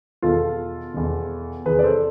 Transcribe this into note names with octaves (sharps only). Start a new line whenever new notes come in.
E2 B2 F4 A4
E2 B2
E2 C3 E3 G#4 B4
D5
A4 C5